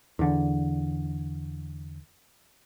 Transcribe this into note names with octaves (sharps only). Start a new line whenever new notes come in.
E2 D3